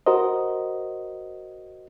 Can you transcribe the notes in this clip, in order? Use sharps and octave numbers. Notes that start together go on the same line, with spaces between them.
F#4 A#4 C5 D#5